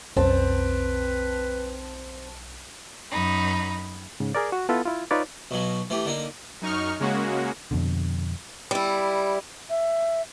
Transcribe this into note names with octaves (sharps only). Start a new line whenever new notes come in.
B1 F2 C4 C#4 B4 A5
F#2 D#4 B5
G#2 C#3
G#4 A#4 D5
F#4
B3 E4 F4 A4 B4
E4 F4
D#4 F4 B4 C#5 D5
B1 B2 F#3
E3 A3 G4
D3 A#3 D#4
F#2 D#4 C#6 F6
C#3 G#3 A#3 C#4 F#4
F2 B2 D3
G3 E4
E5